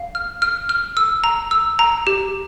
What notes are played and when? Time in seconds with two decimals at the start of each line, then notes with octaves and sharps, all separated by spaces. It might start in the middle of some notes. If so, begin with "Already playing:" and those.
Already playing: F5
0.15 F6
0.42 F6
0.69 F6
0.97 E6
1.24 A#5
1.51 E6
1.79 A#5
2.07 G4